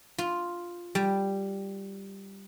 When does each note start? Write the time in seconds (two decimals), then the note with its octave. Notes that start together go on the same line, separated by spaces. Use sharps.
0.18 F4
0.95 G3